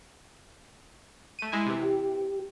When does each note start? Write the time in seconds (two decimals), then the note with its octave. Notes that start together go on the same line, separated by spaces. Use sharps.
1.39 A3 D#7
1.52 G#3 E4 G#5
1.66 C3 E3
1.83 G4